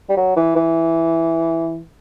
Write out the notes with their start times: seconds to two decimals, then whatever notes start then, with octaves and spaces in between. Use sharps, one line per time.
0.09 G3
0.17 F#3
0.36 E3
0.56 E3